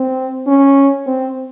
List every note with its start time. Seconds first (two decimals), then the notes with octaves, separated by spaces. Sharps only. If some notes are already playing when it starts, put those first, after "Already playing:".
Already playing: C4
0.47 C#4
1.07 C4